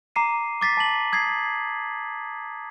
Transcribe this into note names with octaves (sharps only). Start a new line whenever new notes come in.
A#5 D6 C7 D#7
D6 A6 B6 C7
A5 F#7
D#6 G#6 A6 C7